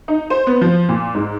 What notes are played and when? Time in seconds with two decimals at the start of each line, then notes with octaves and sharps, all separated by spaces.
0.08 D#4
0.30 C5
0.47 B3
0.61 F3
0.89 A#2
1.15 G#2